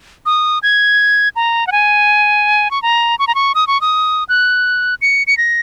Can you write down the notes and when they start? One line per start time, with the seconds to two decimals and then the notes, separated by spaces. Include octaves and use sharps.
0.26 D#6
0.63 G#6
1.36 A#5
1.67 F#5
1.72 G#5
2.71 C#6
2.82 A#5
3.19 C#6
3.27 A#5
3.35 C#6
3.55 D#6
3.67 C#6
3.81 D#6
4.29 F#6
5.02 C#7
5.27 C#7
5.37 A#6